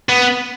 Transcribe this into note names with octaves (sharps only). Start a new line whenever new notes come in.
B3